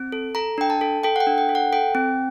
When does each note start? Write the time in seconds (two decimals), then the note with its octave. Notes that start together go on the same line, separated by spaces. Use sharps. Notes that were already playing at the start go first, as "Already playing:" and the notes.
Already playing: C4
0.12 A4
0.35 A4 A#5
0.58 D4 G5
0.70 A5
0.81 A4
1.03 A4 G5
1.16 F#5
1.20 G5
1.27 D4
1.38 G5
1.49 A4
1.55 F#5
1.73 A4 G5
1.95 C4